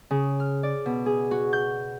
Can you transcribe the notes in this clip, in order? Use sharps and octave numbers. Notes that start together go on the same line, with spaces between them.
C#3
F6
D5
B2
G#4
F#4
G6